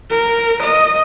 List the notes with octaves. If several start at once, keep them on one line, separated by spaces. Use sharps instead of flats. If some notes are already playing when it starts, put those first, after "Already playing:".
A#4
D#5